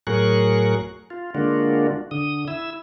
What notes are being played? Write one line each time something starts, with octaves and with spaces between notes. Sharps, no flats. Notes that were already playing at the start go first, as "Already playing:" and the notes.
A2 F#3 G#4 A#4 C#6 F#6
F4
D3 G#3 A#3 D4 F4 F#4
D3 D#6
E4 E6